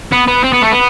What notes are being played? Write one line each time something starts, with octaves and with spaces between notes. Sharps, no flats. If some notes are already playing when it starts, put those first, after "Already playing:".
B3
B3
C4
B3
A3
B3